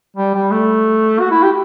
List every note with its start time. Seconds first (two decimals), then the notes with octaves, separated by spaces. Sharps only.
0.16 G3
0.35 G3
0.51 A3
1.20 F#4
1.31 E4
1.43 G4